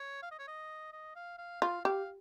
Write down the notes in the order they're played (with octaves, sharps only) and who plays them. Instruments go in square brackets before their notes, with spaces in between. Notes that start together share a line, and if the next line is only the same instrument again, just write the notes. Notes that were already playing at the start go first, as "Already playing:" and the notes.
Already playing: [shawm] C#5
F5
D#5
C#5
D#5
D#5
F5
F5
[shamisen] F4 [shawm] F5
[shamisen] G4 [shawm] F5